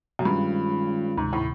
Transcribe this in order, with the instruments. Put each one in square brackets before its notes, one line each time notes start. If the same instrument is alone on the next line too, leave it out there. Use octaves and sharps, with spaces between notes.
[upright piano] F#2
[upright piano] G2 [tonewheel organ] D#3 G#3 C#4 F4
[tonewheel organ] D2 C3 D#3 [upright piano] G#2
[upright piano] A2